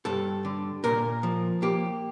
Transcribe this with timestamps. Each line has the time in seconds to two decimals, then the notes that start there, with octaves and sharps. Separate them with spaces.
0.05 G2 A4
0.45 D3
0.84 A#2 A#4
1.23 F3
1.62 A#3 G4